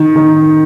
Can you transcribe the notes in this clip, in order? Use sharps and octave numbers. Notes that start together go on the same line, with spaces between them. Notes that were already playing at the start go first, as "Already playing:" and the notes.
Already playing: D#3
D#3